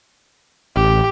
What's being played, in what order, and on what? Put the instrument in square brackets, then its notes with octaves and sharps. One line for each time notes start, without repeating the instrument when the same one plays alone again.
[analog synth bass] A1 [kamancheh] G4